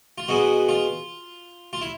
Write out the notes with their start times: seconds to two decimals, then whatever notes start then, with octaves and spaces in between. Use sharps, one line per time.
0.18 F4
0.28 B2 G#3 B3 F#4
0.69 F4
1.73 F4
1.81 E4